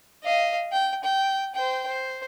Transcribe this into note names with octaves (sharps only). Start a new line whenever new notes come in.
D#5 F5
G5
G5
C5 G5
C5